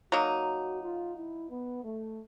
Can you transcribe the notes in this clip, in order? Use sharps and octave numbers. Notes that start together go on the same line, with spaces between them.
F#3 A#3 D#4 F#4
F4
E4
B3
A3